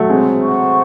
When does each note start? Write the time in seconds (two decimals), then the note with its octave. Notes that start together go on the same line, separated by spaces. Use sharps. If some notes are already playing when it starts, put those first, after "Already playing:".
Already playing: F#3 A3
0.10 G#3 C4
0.43 C5 F#5 C#6